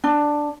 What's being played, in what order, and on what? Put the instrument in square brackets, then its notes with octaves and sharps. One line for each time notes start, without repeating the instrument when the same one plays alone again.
[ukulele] D4